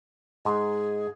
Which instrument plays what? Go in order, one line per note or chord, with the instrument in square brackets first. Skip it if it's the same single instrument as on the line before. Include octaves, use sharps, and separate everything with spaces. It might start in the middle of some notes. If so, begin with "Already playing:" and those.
[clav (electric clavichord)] G#2 [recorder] G#4